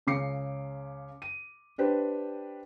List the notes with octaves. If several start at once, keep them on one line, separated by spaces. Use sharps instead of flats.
C#2 C#3 D6 C7 C#7
D#7
D4 G4 B4 C5